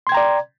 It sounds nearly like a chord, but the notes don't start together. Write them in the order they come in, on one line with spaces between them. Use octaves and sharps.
C6 G#6 G5 A#5 D5